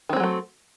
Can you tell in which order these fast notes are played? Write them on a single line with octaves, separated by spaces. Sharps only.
D#3 C4 G#3 F#3 A3